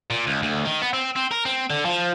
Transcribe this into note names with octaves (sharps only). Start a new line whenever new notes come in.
A#2
C#2
D2
D#3
B3
C4
C4
A#4
C4
D3
F3